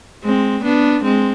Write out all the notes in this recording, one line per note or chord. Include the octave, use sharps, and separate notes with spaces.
G#3 C4
B3 D4
G#3 C4